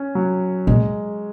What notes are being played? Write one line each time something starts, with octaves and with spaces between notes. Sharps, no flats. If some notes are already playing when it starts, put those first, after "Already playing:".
Already playing: C#4
F#3
A#2 G#3